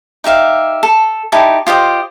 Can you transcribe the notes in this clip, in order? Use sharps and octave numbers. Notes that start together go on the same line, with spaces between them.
D#4 G4 E5 F5
A4
D#4 E4 G4 A5
F4 G4 C5 D#5